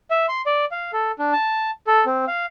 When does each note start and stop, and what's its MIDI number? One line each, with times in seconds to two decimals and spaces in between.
0.11 0.26 76
0.28 0.41 84
0.46 0.65 74
0.71 0.91 77
0.93 1.11 69
1.19 1.33 62
1.33 1.71 81
1.87 2.04 69
2.06 2.25 60
2.28 2.46 77